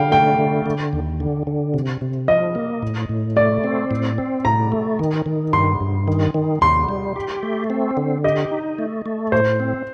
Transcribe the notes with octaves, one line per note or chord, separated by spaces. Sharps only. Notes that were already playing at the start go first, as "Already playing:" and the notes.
Already playing: D3 F5 G5
A3 G5
D3
D3
D#2
D3
D3
C3
C3
F3 D#5
A#3
A2
A2
A3 D5
C4
A2
C4
A2 A#5
A3
D#3
D#3
G2 C6
G2
D#3
D#3
D#2 C6
G3
G4
A3
C4
D3
G4 D#5
D#4
A3
A3
A2 C5
C4